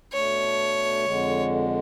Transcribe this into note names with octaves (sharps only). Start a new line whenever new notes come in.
B2 A3 D4 C#5
F2 D3 G#3